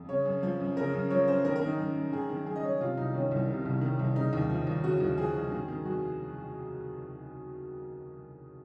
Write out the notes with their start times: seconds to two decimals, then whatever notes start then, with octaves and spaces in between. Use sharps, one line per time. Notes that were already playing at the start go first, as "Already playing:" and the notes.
Already playing: F2
0.09 C#3 C#5
0.25 F#2
0.43 F3
0.60 F#2
0.77 C#3 A#4
0.93 F#2
1.10 F3 C#5
1.28 F#2 C5
1.45 D#3 A#4
1.56 A#4
1.61 D#3
1.67 D#4
1.78 F#2
1.95 F#2
2.12 D#3 G#4
2.29 D#3
2.46 F#2 G#4
2.56 D#5
2.63 F#2 C#5
2.80 C3 F4
2.97 C2 D#4
3.14 D#3 C#4
3.31 C2
3.48 C3
3.65 C2
3.81 D#3
3.99 C2
4.15 C#3 D#4
4.33 D#2
4.49 F3
4.67 D#2
4.84 C#3 F#4
5.00 D#2
5.18 F3 G#4
5.34 D#2
5.52 D#3
5.68 D#3
5.85 F2 F#4